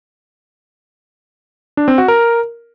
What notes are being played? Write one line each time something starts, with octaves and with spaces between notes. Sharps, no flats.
D4
C4
F#4
A#4